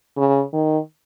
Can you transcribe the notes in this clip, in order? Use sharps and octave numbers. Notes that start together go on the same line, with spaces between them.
C#3
D#3